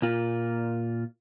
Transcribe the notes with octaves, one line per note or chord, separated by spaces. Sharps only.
A#2 F4